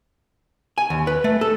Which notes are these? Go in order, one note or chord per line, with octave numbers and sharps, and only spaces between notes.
G#5
D#2
B4
A3
A4